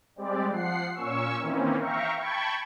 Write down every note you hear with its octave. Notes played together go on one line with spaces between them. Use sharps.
G3 G#3 C4 G4 D5
F3 F#5 C7
A#2 C#4 C#6 E6
D#3 E3 A#3 C4 C#4
E5 F5 G5 A#5 C#6
G5 A5 B5 C#6 G#6